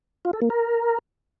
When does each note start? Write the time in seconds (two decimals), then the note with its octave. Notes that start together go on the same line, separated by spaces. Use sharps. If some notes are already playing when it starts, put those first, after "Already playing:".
0.25 F4
0.33 A4
0.42 A#3
0.50 A#4